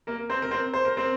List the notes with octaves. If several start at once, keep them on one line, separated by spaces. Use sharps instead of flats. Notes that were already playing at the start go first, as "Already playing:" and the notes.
A#3 A#4
C4 C5
A#4
C4 C5
C5
A#4
C4 C5